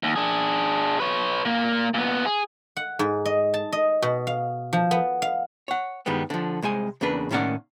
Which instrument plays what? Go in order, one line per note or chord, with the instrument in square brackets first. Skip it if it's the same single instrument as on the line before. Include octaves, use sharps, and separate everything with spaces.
[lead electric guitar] D#2
D4 G#4
B4 C#5
A#2 A#3
A#2 B3
G#4
[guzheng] F#5
G#2
D#5
A5
D#5
B2
F5
F3
B3
F5
[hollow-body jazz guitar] C#5 F#5
G2 D#3 G3 G#3 B3
D3 F3
C2 G#3 C5 G#5
E2 C#3 A#3 D4 B4
A2 D#3 A#3 C#4 D5 F#5